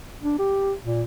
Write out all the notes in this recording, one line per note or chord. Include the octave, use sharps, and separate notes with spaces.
D4
G4
A#2